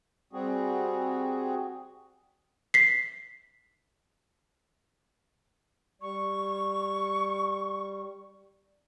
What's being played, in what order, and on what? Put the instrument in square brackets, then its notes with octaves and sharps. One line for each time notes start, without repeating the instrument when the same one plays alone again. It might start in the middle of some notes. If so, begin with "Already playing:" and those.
[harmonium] G3 C4 F#4 G#4
[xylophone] B6 C7
[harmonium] G3 [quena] C#6